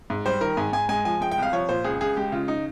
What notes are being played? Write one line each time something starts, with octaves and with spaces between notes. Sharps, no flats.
G#2
G3 C5
D#3 A#4
G#2 G#5
G#2 G#5
G#3 G#5
F3 G#5
G#3 G5
G5
C2 F5
F3 C#5
A#2 C5
C#2 G#4
C#2 G#4
G#3 G4
C#3 F4
D#4